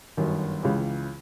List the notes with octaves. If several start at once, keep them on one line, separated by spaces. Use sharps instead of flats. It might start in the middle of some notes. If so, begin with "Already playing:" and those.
G1 F#2 D#3
C#2 C#3 E3